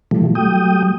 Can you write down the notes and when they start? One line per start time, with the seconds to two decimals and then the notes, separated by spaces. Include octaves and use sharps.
0.11 B2 E3 F3 G3 A3
0.35 F#3 G3 A3 G5 D#6